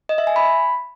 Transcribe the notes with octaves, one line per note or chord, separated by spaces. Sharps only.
D#5
E5
G#5
B5